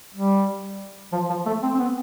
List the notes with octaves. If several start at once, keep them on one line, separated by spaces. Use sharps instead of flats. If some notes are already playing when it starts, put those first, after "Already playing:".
G3
F3
F3
A3
C4
C4
B3